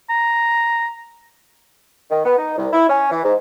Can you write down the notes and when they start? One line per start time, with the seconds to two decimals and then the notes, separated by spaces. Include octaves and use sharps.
0.10 A#5
2.10 D#3
2.25 B3
2.38 D#4
2.57 C2
2.72 E4
2.88 C#4
3.10 E3
3.24 G#2